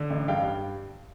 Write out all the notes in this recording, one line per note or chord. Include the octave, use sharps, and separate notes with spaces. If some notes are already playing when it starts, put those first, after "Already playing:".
Already playing: D3
A1
G2 F5 G5